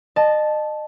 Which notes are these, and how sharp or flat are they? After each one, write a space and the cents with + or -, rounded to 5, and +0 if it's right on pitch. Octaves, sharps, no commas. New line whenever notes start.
D#5 -30 A5 -10